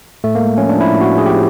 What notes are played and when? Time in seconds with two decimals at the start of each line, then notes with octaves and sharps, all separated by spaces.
0.24 A2 A3
0.35 A#3
0.41 G#3
0.58 F3 C#4
0.69 D4
0.75 F3 E4
0.92 A2
1.01 F#4
1.08 A2
1.18 G#4
1.26 F3 G4